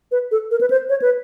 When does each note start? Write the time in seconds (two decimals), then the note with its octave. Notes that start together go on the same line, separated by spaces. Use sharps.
0.11 B4
0.31 A4
0.51 A#4
0.61 B4
0.70 C5
0.89 C#5
1.02 B4